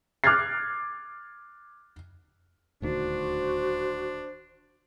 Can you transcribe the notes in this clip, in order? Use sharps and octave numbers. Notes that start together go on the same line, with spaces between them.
D6 F6 F#6 G#6 A6 C7
D#1 D2 D#3 D4 F#4 C5